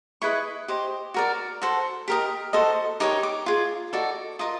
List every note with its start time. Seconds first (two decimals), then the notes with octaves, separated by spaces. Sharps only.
0.22 E4 G#4 B4 D#5 C#6
0.68 G4 C5 D#5
1.14 F#4 A#4 D5
1.62 F#4 A4 C5
2.08 G4 A#4 D#5
2.53 F#4 A4 C5 D#5
3.00 D#4 G4 A#4 C#5 D6
3.23 D6
3.46 F4 G#4
3.93 D#4 F#4 A4 D5
4.39 F4 A#4 D#5 D#6